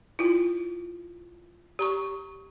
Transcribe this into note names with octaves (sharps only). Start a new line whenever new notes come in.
E4 F4
G4 A#5 C#6